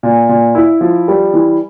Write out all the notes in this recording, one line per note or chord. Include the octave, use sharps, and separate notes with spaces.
A#2
A#2
E4
F3
G3
E3